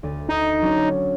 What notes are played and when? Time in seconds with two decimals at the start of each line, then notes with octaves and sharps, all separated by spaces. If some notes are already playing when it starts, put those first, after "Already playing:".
0.03 D2 A6 D#7
0.29 D#4
0.62 F#3 C#4 D4